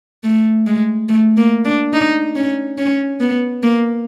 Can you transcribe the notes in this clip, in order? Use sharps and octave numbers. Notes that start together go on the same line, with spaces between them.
A3
G#3
A3
A#3
D4
D#4
C#4
C#4
B3
A#3